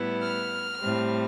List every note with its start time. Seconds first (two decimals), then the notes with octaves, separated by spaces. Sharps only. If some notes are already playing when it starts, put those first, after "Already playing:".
Already playing: A2 G3 B3 E4
0.22 F6
0.80 A2 G3 C4